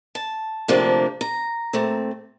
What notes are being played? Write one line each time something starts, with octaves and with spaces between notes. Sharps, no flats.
A5
D2 C3 F3 A#3 D4
A#5
A#2 A3 C4